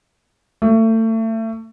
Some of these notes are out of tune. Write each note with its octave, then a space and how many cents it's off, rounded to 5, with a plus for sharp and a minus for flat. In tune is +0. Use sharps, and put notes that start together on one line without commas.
A3 +30